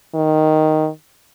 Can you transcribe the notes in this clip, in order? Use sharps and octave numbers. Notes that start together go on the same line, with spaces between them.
D#3